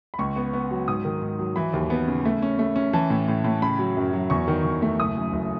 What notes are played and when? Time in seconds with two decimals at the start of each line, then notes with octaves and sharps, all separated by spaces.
0.14 B5
0.19 C#2 C#6
0.36 B3
0.53 B3
0.71 F#3
0.88 G#2 D#6
1.05 D#3
1.22 G#2
1.39 F#3
1.56 E3 B5
1.74 D#2
1.90 B3
2.08 C#3
2.25 A3
2.42 C#4
2.59 A3
2.76 C#4
2.93 E3 A5
3.10 A2
3.28 A2
3.44 A2
3.62 C#3 B5
3.79 F#3
3.97 F#2
4.13 F#3
4.30 E2 C#6
4.48 D#3
4.64 E2
4.82 A3
4.99 F#1 D#6
5.17 F#2
5.33 F#1